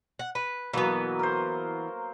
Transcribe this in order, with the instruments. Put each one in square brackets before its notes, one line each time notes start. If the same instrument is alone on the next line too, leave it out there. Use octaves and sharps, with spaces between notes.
[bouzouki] F#5
B4
[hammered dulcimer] B2 F#3 A#3 [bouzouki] E3 B3
[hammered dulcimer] A#4 C5